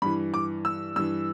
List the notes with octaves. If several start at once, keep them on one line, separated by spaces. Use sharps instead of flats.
G2 E3 B5
D6
E6
G2 E3 E6